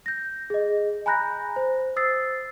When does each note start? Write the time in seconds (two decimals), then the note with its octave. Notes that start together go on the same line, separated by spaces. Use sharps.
0.06 G6 A#6
0.50 G#4 D#5
1.06 G#5 A#5 B5 F#6 G6 A#6
1.56 C5
1.96 C5 D#6 E6 A6 C7